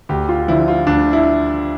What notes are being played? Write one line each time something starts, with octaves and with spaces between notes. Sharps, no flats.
D2 G4
F4
D3 F3 E4
F4
D2 D4
E4